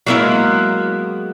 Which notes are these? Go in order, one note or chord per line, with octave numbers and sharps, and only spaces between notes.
F#3 G#3 A#3 B3 E4